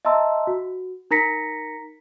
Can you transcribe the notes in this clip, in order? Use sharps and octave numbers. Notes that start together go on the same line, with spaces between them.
D#5 E5 A5 A#5 C6 E6
F#4
D#4 A#4 A#5 A#6 B6 C#7